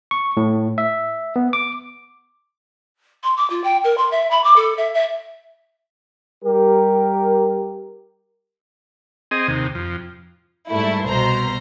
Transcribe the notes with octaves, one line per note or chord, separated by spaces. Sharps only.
C#6
A2
E5
B3
D6
C6
D6
F4
G5
A#4
C6
E5
B5
D6
A4
E5
E5
G3 G4 A#4
C4 G#4 D#5
D#2 C3
F2
G#2 G3 A3 E4
C2 B2 C5 A#5